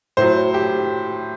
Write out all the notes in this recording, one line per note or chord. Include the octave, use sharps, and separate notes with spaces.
A2 F#3 C5
G4